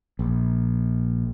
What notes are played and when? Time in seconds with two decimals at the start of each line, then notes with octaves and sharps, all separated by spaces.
0.19 A#1